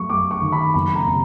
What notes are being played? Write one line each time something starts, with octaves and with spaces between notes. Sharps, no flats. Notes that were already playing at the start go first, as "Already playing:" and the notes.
Already playing: F#3 A3 C#6
F#2 D6
C#6
D#3
B5
F#1 B5
A#5
C3